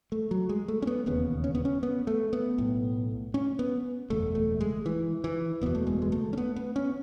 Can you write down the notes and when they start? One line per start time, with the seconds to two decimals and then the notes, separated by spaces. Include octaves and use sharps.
0.12 A3
0.31 F#3
0.49 G#3
0.68 A3
0.82 C#4
0.87 B3
1.06 E1 D#2 C#3 B3
1.44 C#4
1.55 B3
1.65 C#4
1.83 B3
2.07 A3
2.33 B3
2.58 B1 A2
3.34 C#4
3.59 B3
4.10 F#1 E2 B2 A3
4.35 A3
4.61 G#3
4.86 E3
5.24 E3
5.61 F#1 E2 B2 B3
5.75 A3
5.87 G#3
6.02 G#3
6.12 A3
6.33 C#4
6.37 B3
6.56 B3
6.76 C#4